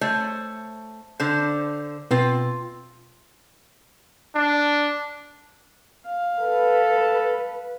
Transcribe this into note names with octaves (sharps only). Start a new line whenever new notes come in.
A3 C5 C#5
D3 C5
B2 C4 F4
D4
F5
A4 B4